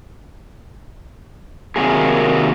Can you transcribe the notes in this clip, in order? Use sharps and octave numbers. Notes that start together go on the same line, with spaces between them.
C3 D#3 F#3 A#3 G#4